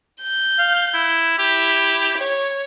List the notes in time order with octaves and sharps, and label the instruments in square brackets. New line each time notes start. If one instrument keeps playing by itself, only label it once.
[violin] G6
[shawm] F5
E4
[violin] E4 [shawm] G4
[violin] C#5